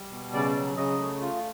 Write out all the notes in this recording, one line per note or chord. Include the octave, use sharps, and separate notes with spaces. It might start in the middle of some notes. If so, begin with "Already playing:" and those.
Already playing: G3
B2
C#3 D5
F#3
C#3 D#5
A3
F4